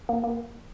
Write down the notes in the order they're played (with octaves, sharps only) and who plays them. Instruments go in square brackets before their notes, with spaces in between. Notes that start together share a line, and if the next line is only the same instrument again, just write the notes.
[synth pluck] A#3
A#3